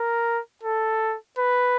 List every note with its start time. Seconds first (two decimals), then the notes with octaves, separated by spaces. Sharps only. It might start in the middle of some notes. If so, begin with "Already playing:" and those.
Already playing: A#4
0.63 A4
1.39 B4